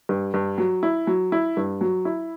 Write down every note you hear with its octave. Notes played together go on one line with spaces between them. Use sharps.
G2
G2
F#3
E4
F#3
E4
G2
F#3
E4